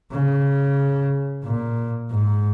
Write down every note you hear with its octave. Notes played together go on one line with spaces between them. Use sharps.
C#3
A#2
G#2